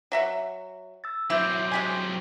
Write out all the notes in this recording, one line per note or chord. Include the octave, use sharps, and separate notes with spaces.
F#3 E5 F#5
E6 A6
F#3 C4 E4 D6 G6
G#3 G4 G#5